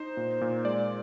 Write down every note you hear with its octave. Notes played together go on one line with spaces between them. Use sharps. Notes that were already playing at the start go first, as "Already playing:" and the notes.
Already playing: D#4 C5
A#2
A#2
G#3 D5